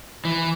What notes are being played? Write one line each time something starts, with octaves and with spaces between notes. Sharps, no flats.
E3